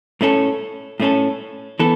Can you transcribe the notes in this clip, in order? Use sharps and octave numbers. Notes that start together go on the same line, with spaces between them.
A2 A3 C#4 A4
A2 A3 C#4 A4
E3 B3 A4